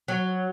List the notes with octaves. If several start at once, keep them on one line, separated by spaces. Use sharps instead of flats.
F#3